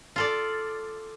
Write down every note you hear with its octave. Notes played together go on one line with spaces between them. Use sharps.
F4 A4 D5